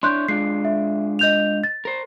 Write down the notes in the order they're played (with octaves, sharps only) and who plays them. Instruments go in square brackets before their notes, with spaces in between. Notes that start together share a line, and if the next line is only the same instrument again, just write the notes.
[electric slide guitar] D4 E4 C#5 [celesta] C6 F#6 G6
[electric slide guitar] G#3 D4 F4 [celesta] C7
[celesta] E5
D#5 G6 F7
A6
[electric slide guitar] A#4 C5